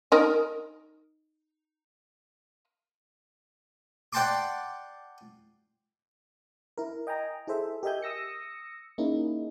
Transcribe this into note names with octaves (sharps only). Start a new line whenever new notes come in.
D#4 A#4 D#5
D5 F#5 G5 A5 C6 D6
E4 A#4
D#5 G5 G#5 A#5
E4 G#4 A4 C5 E5
G4 A#4 D#5 E5 G#5 G6
D#6 E6 A#6 C#7
A#3 C#4 D#4 E4 G#4